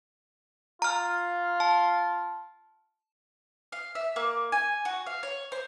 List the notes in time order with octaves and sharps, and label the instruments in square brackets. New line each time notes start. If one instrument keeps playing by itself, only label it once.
[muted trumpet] F4 [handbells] A#5 F6
[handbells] A5
[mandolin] F5
E5
A#3
G#5
F#4
F5
C#5
C5